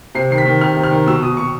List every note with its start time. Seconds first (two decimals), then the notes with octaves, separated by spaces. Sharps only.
0.15 C3 C7
0.31 D#3 C7
0.38 B6
0.46 D#3
0.61 C3 F6
0.77 C3
0.84 F6
0.91 D#3
1.06 B2 E6
1.22 B2 D#6
1.37 B2 C#6